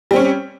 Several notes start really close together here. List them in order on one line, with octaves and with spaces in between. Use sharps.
G3 C4 C#4